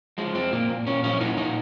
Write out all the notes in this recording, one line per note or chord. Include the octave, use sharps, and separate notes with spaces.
F3 G#3
F3 C4
A#2 A#3
A#2
A#2 C#4
F3 C#4
A#2 D#4
A#2 D#4